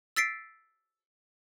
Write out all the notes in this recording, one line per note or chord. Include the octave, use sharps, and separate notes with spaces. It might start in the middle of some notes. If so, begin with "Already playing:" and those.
E6 A6 B6 C7 D7